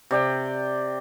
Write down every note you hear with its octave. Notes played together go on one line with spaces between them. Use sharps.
C3 D5 G5